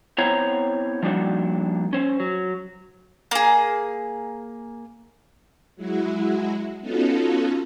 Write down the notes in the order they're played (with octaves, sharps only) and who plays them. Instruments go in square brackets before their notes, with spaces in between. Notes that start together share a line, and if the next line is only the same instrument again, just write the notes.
[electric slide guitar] B3 C4 E4 C5 C#5 A#5
F3 G3 A#3 D4 D#4 F#4
C#4 C5
F#3
[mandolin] A#3 G#4
[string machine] F#3 G#3 E4 F#4
B3 C#4 D#4 F4 F#4 A4